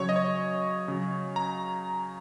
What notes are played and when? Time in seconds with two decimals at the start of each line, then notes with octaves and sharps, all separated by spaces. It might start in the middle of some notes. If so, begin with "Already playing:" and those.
Already playing: C#3 F#3 C#5
0.09 D#5
0.16 C#5
0.88 C#3 F#3
1.36 A#5